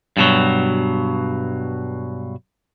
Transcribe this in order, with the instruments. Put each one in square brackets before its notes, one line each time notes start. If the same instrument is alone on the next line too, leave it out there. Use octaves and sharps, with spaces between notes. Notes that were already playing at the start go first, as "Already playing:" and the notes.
[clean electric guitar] G2 B2 F#3